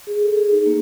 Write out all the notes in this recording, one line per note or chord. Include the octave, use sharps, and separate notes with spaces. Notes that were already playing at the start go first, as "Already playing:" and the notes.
G#4
A4
G#4
D#4
A#3